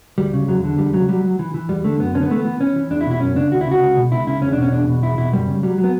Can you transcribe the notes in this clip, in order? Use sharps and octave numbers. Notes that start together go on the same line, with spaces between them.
D2 G3
C#3
E2 F#3
D3
E2 G3
C#3 F#3
F#3 G3
F#3
E3
E3
E2 G3
D3 A3
F#2 B3
D3 C#4
B3
E3 A3
B3
E3
E3 C#4
E3
E2 D4
E4
B2
E4
F#2 C#4
C#3 D4
D2 F#4
E4
C#3
F#4
C#2
B2
C#2 E4
C#3 E4
E2 C#4
D4
B2 C#4
E2 D4
B2
E2 E4
B2 E4
F#2 G3
C#3
F#3 G3
F#3
B3